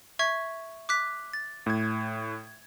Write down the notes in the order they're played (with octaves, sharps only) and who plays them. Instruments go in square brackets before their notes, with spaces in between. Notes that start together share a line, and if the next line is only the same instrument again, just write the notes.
[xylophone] E5 C#6 G#6
D6 F#6 B6
A6
[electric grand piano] A2 G#6